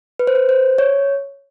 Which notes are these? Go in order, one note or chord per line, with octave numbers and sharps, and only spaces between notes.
B4
C5
B4
C5
C#5